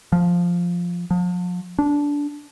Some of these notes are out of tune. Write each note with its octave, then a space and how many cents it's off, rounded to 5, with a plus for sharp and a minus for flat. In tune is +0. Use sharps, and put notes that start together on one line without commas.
F3 +0
F3 +40
D4 -15